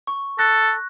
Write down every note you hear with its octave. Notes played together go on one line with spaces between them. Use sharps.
C#6
A4 F#6 A#6